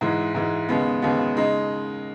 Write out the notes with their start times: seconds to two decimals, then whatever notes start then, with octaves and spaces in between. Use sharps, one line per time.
0.01 G#2 E3 G#3
0.35 G#2 E3 G#3
0.69 D#2 C#3 G#3 B3
1.02 D#2 C#3 G#3 B3
1.37 C#3 G#3 D#4